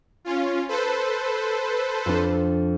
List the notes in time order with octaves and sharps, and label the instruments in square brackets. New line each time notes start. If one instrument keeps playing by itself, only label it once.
[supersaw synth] C#4 F4
A4 B4 C5
[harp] F2 D4